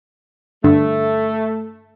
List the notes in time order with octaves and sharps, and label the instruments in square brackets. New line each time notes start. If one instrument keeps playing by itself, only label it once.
[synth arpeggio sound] G2 D3 [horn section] A3